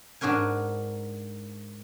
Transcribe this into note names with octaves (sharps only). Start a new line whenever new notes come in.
G#2 D4 F#4 A#4 G#5